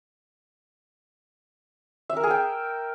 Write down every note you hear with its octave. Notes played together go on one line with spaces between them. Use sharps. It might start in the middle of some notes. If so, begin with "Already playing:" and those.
E5
A#4
G#4
G5